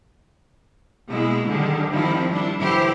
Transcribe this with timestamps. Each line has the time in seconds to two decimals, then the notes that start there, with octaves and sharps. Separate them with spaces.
1.08 B2 G#3 A#3 E4
1.47 D3 D#3 G3 G#3
1.89 D#3 F3 G3 C4 E4 F4
2.30 G3 D4 E4
2.58 D3 E3 F#3 E4 G4 C5